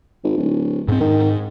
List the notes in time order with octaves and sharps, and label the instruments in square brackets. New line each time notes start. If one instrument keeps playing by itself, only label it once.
[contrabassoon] G#1
D1
[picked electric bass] G#2 C4
[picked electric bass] G#2 [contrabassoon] D#3